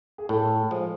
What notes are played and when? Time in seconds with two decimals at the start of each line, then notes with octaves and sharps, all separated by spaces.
0.18 G#4
0.29 A2 A4
0.71 F3 G#3